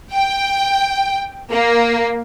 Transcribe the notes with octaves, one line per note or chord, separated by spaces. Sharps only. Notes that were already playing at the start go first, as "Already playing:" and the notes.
G5
A#3